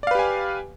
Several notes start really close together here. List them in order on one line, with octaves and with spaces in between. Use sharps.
D5 F5 B4 G4 G#5